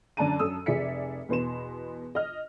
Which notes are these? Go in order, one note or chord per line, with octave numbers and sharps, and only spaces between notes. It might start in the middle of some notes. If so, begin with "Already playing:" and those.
F#2 D3 D5 A5 A#5 D#7
F#2 A4 D#6 E6
F1 G#4 D5 E5 B6 C#7
E2 B2 B3 C6 E7
D#5 F6